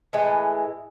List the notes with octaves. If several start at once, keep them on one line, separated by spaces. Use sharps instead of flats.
A2 E3 G#3